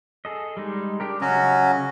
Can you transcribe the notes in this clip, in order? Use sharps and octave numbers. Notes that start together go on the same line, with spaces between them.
G#4 A4 D#5
G3 G#3 D#4
D4 G4 A#4
C#3 F#3 C#4 F#4 D#5 F5